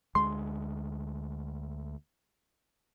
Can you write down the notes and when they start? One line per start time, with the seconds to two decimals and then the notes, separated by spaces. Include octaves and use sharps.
0.15 D2 G#3 C6